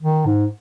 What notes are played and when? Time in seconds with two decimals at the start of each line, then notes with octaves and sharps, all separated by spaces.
0.01 D#3
0.26 G#2